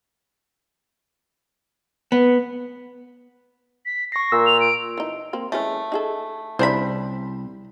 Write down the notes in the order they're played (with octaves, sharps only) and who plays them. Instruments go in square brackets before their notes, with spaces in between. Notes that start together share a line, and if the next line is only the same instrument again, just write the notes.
[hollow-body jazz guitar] B3
[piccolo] B6
[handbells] C#6 C7 [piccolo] A#6
[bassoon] A#2 [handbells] E6
[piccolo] F7
D7
[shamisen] E3 D#4
A#3 C4
[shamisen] E3 G#3 C#4 [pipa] A3
[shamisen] D#4 G#4 A4
[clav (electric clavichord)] C2 [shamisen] C#3 D4 E5 [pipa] C5 B5